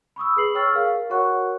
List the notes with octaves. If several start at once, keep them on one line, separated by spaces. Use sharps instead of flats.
B5 C#6 D#6 E6
G#4 B4 C7 F#7
C#5 G5 C#6 E6 F6 A6
G#4 A#4 F5
F#4 A#4 C#5 F#5 C#6 F#6